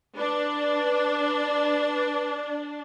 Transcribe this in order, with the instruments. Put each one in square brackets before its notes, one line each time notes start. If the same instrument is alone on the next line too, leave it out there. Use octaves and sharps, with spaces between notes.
[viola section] D4 [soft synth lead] B4